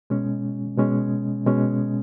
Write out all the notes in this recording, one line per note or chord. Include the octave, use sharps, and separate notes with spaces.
B2 G#3 C#4
B2 G#3 C#4
B2 G#3 C#4